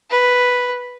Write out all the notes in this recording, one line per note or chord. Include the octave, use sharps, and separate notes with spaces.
B4